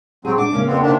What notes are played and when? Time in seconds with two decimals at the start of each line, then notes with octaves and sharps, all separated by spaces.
0.25 F#3 C4 G#4
0.38 D4 D6
0.53 C#3 A#3 C#4
0.67 F2 B3 C4
0.82 C3 D#3 D4